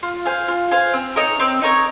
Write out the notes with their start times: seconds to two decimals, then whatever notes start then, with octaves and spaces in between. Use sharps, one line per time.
0.03 F4
0.25 C5 F5 G#5
0.48 F4
0.71 C5 F5 G#5
0.93 C4
1.16 D#4 A#4 C#5
1.40 C4
1.62 D#4 A#4 C#5